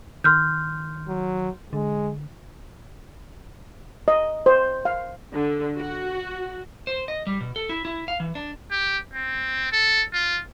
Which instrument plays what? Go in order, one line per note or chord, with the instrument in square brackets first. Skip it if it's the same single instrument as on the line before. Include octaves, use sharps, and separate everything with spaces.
[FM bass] D#3 [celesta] C6 F6 G6
[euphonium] F#3
[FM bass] D3 [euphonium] G#3
[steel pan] D#5
C5
F5
[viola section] D3
F#4
[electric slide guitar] C5
D#5
G3
B2
A4
E4
E4
F5
E3
D4
[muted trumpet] G4
C4
A4
F4